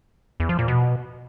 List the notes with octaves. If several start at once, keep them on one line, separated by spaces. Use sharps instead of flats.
E2
F3
A#2
B2